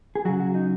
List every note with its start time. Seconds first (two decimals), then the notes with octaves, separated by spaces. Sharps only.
0.15 G#4
0.25 C#3 F#3 F#4
0.40 F#4
0.55 D#4